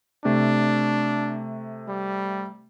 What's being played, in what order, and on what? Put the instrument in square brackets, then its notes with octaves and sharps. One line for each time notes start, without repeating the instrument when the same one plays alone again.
[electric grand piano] C3 A3 [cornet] D4
[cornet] G3